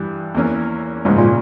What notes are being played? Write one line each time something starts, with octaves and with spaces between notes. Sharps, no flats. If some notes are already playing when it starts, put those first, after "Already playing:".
Already playing: G2 E3 G3
E2 E3 A#3 C#4
C#2 G#2 C#3 F3 A#3 C#4
A#2